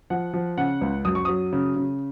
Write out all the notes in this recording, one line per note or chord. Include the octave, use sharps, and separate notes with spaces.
F3 F#5
F3
C#3 F#5
C#2
F#2 D#6
C#6
F#3 D#6
C#3
C#3